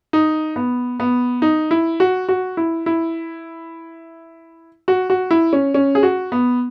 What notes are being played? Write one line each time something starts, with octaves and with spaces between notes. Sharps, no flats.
D#4
B3
B3
D#4
E4
F#4
F#4
E4
E4
F#4
F#4
E4
C#4
C#4
G#4
F#4
B3